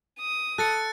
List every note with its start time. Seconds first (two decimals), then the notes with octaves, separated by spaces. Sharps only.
0.19 D#6
0.58 A4 F#6 A6 C#7